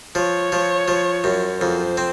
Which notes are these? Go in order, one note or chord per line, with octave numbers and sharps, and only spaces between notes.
F3 C#5
F3
F3
F#2
F2 C5
C4